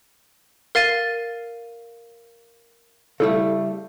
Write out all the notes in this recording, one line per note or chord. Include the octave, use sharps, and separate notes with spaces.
A#4 F5 A6 D#7
C#3 G3 A3 E4 A4